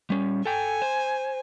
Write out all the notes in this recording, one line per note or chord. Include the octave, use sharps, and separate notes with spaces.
G3 C#4
A4 G5 G#5
C5